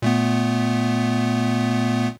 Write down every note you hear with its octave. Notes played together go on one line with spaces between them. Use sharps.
A#2 A3 B3